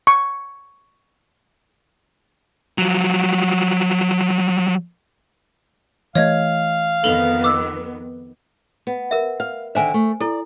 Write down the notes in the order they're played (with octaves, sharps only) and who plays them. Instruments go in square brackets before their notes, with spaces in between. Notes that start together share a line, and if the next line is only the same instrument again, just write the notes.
[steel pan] C#6
[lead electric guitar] F3 F#3
[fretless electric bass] E3 A3 [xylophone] C#5 D#5 G#6 [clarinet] F5
[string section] F2 D#3 B3 [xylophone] A4 F7 G7
[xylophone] D6 E6
[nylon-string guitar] B3
[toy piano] A#4 E5
[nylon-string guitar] F5
[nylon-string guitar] D3 D#3 E5 [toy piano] C5 G#5
[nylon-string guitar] A3
[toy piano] E4 A4 [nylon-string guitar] D5